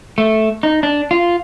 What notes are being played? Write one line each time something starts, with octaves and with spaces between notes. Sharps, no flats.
A3
D#4
D4
F4